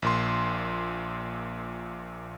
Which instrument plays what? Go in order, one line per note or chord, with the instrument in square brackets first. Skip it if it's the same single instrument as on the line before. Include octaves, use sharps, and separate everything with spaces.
[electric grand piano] A#1 A#2 C6